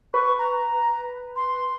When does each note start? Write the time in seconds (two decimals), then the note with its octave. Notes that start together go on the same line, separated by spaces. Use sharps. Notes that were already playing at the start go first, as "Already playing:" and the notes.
0.14 B4 C#6
0.39 A#5
1.36 C6